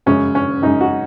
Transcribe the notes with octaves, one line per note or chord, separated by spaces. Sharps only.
F#2 C#3 G#3 C#4
C#4
F#2 C#3 G#3 D#4
F#4